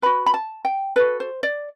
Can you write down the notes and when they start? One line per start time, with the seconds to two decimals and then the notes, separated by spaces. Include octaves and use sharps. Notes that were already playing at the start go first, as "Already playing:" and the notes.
0.02 F#4 B4 B5
0.26 B5
0.34 A5
0.65 G5
0.96 F#4 A4 B4
1.20 C5
1.43 D5